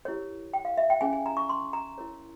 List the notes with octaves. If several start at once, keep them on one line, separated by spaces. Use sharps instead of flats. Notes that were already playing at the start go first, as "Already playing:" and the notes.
E4 G4 A#4 C#5
G5
F5
E5
G5
C#4 E4 G#4 C#5 G#5
G#5
A#5
C#6
C6
A#5
E4 A#4 C#5